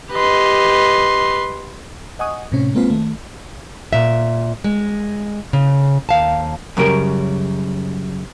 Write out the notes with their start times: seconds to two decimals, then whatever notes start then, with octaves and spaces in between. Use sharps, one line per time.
0.13 G4 B4 D#5 C6
2.19 D#5 F#5 G#5 C#6 D#6
2.52 A2 C3 C#4
2.74 G#3 A#3 C4 F4 B4 C5
2.90 D#3 A3
3.93 A#2 E5
4.64 G#3
5.53 C#3
6.09 D#2 F5 A5
6.77 F#2 C#3 G3 A#4 G5